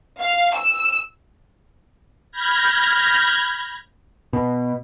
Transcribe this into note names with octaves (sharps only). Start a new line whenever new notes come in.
F5
E6
B5 F6 G6 G#6 A#6
B2